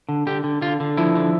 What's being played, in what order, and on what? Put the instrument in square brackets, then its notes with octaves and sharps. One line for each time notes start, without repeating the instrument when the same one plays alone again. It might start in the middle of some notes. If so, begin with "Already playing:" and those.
[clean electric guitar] D3
D3 G4
D3
D3 F4
D3
F3 E4
D3